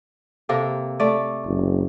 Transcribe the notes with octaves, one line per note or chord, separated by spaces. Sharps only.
C3 A#3 A4
A3 D5
F#1